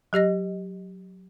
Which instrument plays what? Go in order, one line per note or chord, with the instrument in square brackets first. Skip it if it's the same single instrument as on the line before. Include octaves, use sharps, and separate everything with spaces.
[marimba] F#3 G4 D#5 A#6